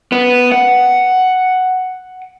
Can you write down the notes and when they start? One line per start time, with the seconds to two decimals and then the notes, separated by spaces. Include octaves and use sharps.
0.12 B3
0.52 F#5